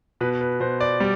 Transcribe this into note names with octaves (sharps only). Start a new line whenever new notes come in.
B2 B4
B4
B2 C5
D5
G3